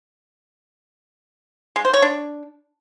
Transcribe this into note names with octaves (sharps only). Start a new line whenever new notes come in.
G#3
C5
C#5
D4